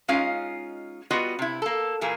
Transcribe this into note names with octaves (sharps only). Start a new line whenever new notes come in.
G#3 C#4 D#4 F4 F5
G3 B3 F4 F#4 D#5
C3 E4
A#3 A4
A#2 E3 A#3 G#4